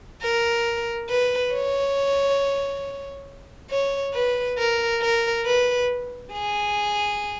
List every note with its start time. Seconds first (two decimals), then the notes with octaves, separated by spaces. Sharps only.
0.22 A#4
1.09 B4
1.52 C#5
3.71 C#5
4.14 B4
4.58 A#4
5.01 A#4
5.45 B4
6.32 G#4